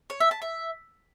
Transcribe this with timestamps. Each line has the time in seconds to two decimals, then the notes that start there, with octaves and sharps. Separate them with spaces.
0.10 C#5
0.20 E5
0.31 A5
0.42 E5